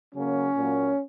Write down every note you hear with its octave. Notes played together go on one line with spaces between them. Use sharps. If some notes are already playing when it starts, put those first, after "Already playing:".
C#3 F#3 A#3 C#4
A#2 F#3 A#3